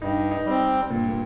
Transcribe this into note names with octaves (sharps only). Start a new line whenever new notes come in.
G2 D#4
D#4
G3 C4
G2 A#2
A#2